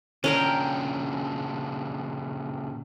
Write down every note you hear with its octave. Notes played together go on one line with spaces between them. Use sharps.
A#2 C#3 C#4 D4 A#4 G5